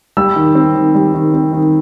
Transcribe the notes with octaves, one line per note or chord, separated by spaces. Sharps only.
G3 E6
D#3
C4
D#3
G3
D#3
C4
D#3